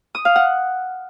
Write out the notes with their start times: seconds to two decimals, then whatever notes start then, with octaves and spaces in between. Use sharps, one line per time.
0.15 D#6
0.25 F5
0.36 F#5